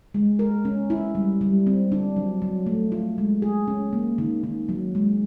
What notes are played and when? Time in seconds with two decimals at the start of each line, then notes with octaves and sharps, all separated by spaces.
0.14 G#3
0.39 A#4
0.65 C#4
0.90 E4
1.15 G3
1.41 G3
1.67 C4
1.92 D4
2.16 F#3
2.42 F#3
2.66 A3
2.92 F4
3.18 G#3
3.42 G#4
3.67 C#4
3.93 A#3
4.18 D#3
4.44 D#3
4.69 F#3
4.95 G#3